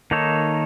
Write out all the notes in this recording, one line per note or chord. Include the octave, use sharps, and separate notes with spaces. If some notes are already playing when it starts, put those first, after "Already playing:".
D#3 A#3 D#4 A4 C#5